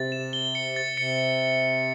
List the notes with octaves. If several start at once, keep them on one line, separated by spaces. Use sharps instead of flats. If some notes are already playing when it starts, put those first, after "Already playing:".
Already playing: C3 A6
E7
G7
C#7
A6
C3 C#7